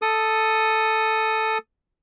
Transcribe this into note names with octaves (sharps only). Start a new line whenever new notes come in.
A4 D#6